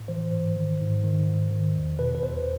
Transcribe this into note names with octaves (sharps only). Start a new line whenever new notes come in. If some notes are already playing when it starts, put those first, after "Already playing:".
Already playing: A2
E3 C5
G#2
D#3
G#2
D#3
G#2
D#3
E2
B2 B4
B4
E2 C5